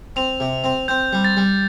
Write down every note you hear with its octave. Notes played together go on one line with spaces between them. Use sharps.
C4 F7
C3
C4
C4 G6
G3
A6
G3